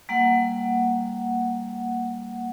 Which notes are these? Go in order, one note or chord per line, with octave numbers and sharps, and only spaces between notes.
G3 A#3 F#5